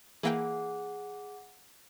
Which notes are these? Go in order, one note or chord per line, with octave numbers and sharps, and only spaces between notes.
E3 A#3 G#4 F#5 G5